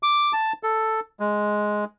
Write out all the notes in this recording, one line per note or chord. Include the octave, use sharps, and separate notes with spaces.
D6
A5
A4
G#3